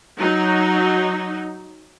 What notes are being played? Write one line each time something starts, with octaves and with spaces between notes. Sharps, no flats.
F#3 D#4